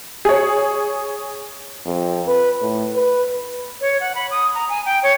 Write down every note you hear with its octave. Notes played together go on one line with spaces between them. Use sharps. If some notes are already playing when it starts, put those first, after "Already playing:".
G#4 C#5
F2
B4
A2
B4
C#5
F#5
B5
D#6
A#5
G#5
G5
C#5